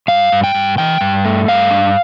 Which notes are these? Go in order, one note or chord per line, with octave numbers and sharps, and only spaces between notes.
G2 F5
G2
G5
G2
E3 G5
G2
A3
G2 F5
D4